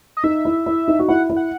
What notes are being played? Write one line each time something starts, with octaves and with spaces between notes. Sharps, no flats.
D#5
D#4 E5
E4
E4
D#4
F#4
E4 F#5
E4
F#5